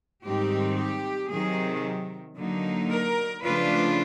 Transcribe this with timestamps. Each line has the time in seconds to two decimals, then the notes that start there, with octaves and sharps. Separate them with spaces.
0.23 G#2 D#3 G3 C4 D#4 G4
0.77 G4
1.30 C3 D#3 F#3 G#4
2.37 D3 F#3 A#3 D#4
2.91 A#4
3.44 C#3 F3 A3 D4 F4 B4